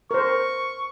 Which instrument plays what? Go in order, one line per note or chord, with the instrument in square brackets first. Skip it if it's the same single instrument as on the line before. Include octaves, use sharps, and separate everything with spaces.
[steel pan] A#4 C5 [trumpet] C#6